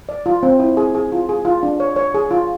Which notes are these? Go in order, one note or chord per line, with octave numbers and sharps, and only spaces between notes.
D5
F4
C4
E4
G#4
G#4
F4
G#4
F4
D4
C#5
C#5
G#4
F4